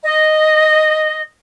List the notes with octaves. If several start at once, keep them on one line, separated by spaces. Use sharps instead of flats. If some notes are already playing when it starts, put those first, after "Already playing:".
D#5